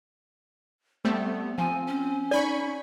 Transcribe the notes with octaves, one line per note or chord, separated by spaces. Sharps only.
G3 A3 B3 C4
F3 C4 G#5
C#4
D#4 D5 G#5 B5 C#6